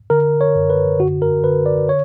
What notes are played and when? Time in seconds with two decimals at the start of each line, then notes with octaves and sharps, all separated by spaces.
0.10 D3 A#4
0.41 C#5
0.55 F#2
0.70 B4
0.99 D3 F#4
1.22 A#4
1.44 D3 B4
1.66 D5
1.89 C#5